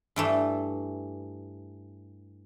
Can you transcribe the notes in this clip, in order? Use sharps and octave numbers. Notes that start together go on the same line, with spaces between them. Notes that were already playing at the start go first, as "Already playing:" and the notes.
G2 E3 A3